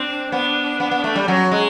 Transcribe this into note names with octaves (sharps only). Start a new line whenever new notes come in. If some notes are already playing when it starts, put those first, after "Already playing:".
Already playing: C4 D4
B3 D4
B3
B3
A3
G3
F#3 C#4
G#3